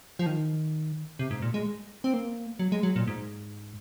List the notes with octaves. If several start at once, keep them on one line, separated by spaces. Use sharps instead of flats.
F3
D#3
C3
G#2
A#2
G#3
C4
A#3
F#3
G#3
F#3
A#2
G#2